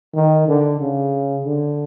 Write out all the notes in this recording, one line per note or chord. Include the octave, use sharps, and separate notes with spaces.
D#3
D3
C#3
D3